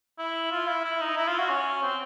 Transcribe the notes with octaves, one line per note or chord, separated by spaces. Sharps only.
E4
F4
E4
E4
D#4
E4
F4
F#4
C#4
C4